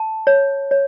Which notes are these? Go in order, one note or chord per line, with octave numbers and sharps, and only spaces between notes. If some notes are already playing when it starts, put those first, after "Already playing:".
Already playing: A5
C#5
C#5